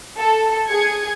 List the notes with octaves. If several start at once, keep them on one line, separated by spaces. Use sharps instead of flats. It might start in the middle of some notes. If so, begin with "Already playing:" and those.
A4
G#4 G#6 C#7